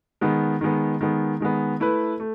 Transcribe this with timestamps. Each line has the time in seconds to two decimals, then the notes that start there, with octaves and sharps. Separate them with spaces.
0.21 D#3 G#3 B3
0.61 D#3 G#3 B3
1.01 D#3 G#3 B3
1.40 D#3 G#3 B3
1.80 A3 E4 B4
2.20 A3